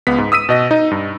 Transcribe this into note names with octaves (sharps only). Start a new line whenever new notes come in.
C#2 B3 B6
G#2
D#6 E6 B6 D#7
B2 D#5 A#6
D#4 D#5
G2